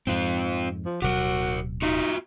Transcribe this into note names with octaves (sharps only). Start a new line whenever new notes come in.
F2 G#2 C4 F4
F3
D1 B2 F#3 F#4 G4 A#4
D#4 F4 F#4 E5